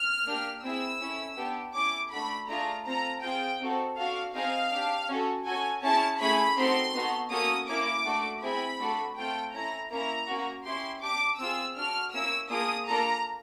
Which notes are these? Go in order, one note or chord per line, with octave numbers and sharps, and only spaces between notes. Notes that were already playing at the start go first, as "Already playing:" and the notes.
Already playing: F6
A#3 D4 G4
C4 E4 G#4 E6
C#4 E4 A4
B3 D4 G4
C#4 E4 A4 D6
A3 D4 F#4 A4 B5
A3 D4 F4 G#4 A#5
C4 F4 A4 A#5
C4 F4 G#4 G5
C4 D#4 F#4 A4
D4 F#4 A4 F5
C4 D#4 G#4 F5
D4 G4
C#4 F#4 A4
C#4 F#4 A4 G#5
C#4 E4 G#4 A5
A3 C#4 E4 G#4 B5
C4 D#4 F#4 A4 C6
B3 D#4 F#4 A4
A#3 C#4 F#4 A4 D#6
A#3 C#4 E4 D6
A3 D4 F#4 A4
C4 E4 G#4 B5
A3 D4 F#4 A4
A3 C4 F4 A4 G5
C#4 E4 A4 A#5
A#3 C#4 E4 A#5
A#3 C#4 F#4
C#4 E4 G4 C6
D4 G4 D6
C4 F4 G#4 E6
D4 F#4 A4 F6
A#3 C#4 E4 E6
A#3 D4 F4 G#4 D#6
A#3 D4 F4 A4 A#5